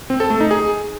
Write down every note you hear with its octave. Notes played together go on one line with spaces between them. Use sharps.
C4
A4
A3
D#4
G#4